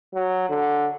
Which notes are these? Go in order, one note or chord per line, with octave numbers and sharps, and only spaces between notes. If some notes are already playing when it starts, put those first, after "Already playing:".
F#3
D3